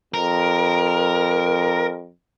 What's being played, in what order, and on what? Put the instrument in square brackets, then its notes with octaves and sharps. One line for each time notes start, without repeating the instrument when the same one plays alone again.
[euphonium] F2 [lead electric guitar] A#4